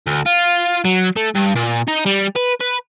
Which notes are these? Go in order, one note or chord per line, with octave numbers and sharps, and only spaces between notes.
D2
F4
F#3
A3
G2
A#2
D#4
G3
B4
B4